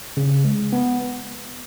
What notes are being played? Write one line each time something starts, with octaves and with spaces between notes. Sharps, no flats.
C#3
G#3
B3